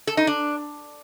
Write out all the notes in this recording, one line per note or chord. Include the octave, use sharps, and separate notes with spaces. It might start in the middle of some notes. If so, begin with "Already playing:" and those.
A4
D#4
D4